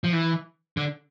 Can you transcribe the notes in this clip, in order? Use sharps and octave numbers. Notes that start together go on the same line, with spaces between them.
F3
E3
D3